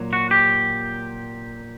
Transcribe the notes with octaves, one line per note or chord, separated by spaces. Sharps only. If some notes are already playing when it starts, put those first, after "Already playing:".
Already playing: A#2 F#3
F#4
G4